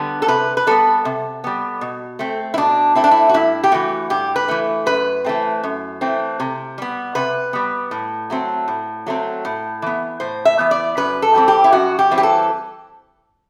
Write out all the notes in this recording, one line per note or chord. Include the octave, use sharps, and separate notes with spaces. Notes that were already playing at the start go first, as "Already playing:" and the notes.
Already playing: D3 G3 B3
A4
C3 B4
B4
G3 B3 A4
C3
G3 B3
B2
A3 C4
E4
B2 D4
A3 C4 E4
D4
E4
F#4
G2 E4
G4
E3 A3 F#4
G2 G4
B4
E3 A3
F#2 B4
E3 A3 C4
F#2
E3 A3 C4
C3
G3 B3
C3 B4
G3 B3
A2
F#3 A3 C4
A2
F#3 A3 C4
A2
E3 B3
A2 C5
E5
E3 B3
D5
F#2 B4
A4
E3 G3 C4
G4
E4
F#2 F#4
G4
E3 G3 C4
G4
A4